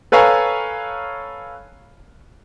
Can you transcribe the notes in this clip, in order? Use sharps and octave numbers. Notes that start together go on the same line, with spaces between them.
A4 B4 C#5 F5 G#5 A#5